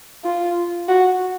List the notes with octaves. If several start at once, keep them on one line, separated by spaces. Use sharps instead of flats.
F4
F#4